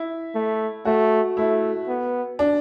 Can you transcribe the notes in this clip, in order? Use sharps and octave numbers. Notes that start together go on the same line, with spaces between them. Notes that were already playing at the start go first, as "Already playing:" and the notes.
Already playing: E4
A3
A3 F#4
A3 E4
B3
D4